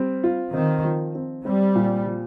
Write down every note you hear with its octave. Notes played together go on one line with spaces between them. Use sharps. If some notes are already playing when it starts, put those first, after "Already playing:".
Already playing: G3 C4
F4
D#3 C4
F3
C4
G3 C4
A#2
F3